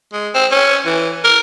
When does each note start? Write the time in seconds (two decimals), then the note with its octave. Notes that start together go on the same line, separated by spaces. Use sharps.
0.13 G#3
0.35 C4
0.51 C#4
0.86 E3
1.24 A#4